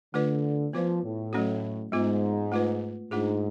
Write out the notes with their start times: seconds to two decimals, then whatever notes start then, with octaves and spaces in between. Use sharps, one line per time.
0.14 D3 A3 F4 B4 D5
0.73 F3 B3 F4 B4 D5
1.03 A2
1.33 F#3 A3 C#4 F#4
1.92 G#2 G#3 B3 F4
2.52 A3 F4 B4
3.11 G#2 A3 D4 F4 G#4